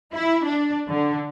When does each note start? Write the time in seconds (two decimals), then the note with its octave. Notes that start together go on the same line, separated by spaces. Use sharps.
0.14 E4
0.45 D4
0.88 D3